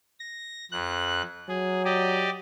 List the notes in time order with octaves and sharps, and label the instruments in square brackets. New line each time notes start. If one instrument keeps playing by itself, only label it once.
[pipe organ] A#6
F2 F#6
[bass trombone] F#3 [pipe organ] G#4
[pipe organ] G4 D5 D#5